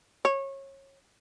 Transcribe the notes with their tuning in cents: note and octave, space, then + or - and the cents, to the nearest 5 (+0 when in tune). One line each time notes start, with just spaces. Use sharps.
C#5 -25